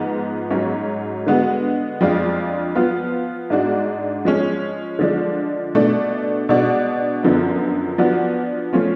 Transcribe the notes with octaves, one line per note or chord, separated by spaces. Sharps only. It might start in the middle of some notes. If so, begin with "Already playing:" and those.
Already playing: G#2 F3 B3
G#2 F#3 C#4
D3 G#3 B3 F#4
F2 F3 G#3 D4 F4
F3 B3 F4
G#2 G#3 D4 F#4
F3 G#3 C#4
D3 F3 G#3 D4
B2 A3 D4
B2 G#3 D4 F#4
F#2 D3 F3 B3
F3 B3 D4 F#4
F3 A3 C#4 F4